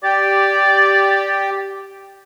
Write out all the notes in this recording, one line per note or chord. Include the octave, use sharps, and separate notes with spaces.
G4 D5